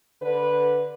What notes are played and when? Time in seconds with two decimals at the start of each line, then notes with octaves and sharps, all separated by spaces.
0.22 D3 B4